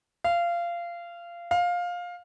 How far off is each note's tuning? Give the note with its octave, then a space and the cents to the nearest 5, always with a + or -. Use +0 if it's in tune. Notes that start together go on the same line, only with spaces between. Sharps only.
F5 -20
F5 +15